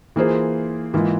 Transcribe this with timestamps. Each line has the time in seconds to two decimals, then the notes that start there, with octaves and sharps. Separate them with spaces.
0.16 E3 A#3 F4 G#4 C5
0.93 G#2 E3 A#3 F4